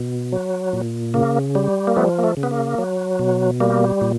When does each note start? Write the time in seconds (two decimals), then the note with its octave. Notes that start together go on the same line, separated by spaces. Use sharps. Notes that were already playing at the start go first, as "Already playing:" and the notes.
Already playing: B2
0.32 F#3
0.73 A#2
1.14 C#3 A#3
1.55 G3
1.87 A#3
1.97 F3 A3 B3
2.19 A#3
2.24 A3
2.37 C#3
2.43 B3
2.51 A#3
2.78 F#3
3.19 B2
3.60 G3 A#3
4.01 A#2